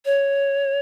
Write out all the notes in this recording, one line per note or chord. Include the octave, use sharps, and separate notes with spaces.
C#5